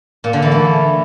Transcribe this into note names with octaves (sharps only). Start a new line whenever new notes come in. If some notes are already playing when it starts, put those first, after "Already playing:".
A#2
D3
E3
A3